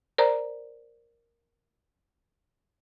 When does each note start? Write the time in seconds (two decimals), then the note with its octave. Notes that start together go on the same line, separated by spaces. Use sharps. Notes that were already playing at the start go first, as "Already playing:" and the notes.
0.18 A#4 C5 D5 A#5